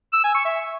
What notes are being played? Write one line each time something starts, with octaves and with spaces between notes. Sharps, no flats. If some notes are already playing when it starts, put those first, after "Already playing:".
E6
G#5
C#6
E5